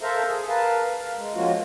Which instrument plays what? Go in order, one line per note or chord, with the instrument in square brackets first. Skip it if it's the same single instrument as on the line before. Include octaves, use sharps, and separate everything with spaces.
[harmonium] A4 A#4 C5 E5 F5 A#5
G#4
A#4 B4 F5 A5
F5
G#3
F3 G#3 A#3 C#4 F4 F#4